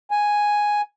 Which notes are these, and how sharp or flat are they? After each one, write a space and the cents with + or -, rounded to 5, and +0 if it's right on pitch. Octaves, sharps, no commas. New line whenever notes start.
G#5 +0